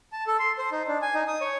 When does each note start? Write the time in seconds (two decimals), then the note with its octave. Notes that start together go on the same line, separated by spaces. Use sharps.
0.12 A5
0.27 A4
0.39 C6
0.58 C5
0.72 D#4
0.88 D4
1.02 G#5
1.14 D#4
1.28 D#6
1.41 C#5